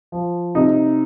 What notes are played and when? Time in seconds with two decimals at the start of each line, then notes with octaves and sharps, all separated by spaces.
0.12 F3
0.55 C3 D#4